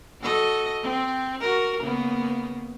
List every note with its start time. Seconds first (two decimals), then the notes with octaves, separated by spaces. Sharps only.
0.21 F#4 A4 D#5
0.82 C4
1.40 F#4 A#4
1.81 C#3 A#3 B3